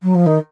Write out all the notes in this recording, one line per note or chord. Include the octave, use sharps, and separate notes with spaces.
F#3
F3
D#3